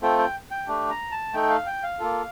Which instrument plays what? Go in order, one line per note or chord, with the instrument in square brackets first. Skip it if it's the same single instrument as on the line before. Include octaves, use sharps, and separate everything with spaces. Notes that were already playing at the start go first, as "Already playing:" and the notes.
[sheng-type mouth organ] A3 C4 F4 A4 G5
G5
G5
A3 D4 G4
A#5
A5
A3 D#4 A4 G5
F5
G5
F5
A#3 F4 A4